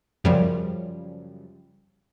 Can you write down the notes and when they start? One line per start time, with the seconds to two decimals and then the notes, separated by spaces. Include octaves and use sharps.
0.24 F#2 C#3 F3 G3